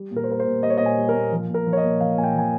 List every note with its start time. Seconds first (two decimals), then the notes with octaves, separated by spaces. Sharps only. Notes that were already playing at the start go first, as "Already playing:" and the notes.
Already playing: G3
0.11 A#2
0.16 A#4
0.24 C5
0.28 G3 A#4
0.40 C5
0.46 A#2
0.62 G3 D#5
0.70 C#5
0.78 A#2 D#5
0.86 G#5
0.97 G3
1.09 A#4
1.14 A#2
1.32 F3
1.49 A#2
1.54 A#4
1.66 F3
1.73 C#5
1.77 D#5
1.84 A#2
2.00 F3 F5
2.18 A#2 G#5
2.24 G5
2.34 F3 G#5